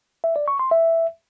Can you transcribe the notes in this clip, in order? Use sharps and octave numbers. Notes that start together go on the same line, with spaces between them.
E5
D5
C#6
C6
E5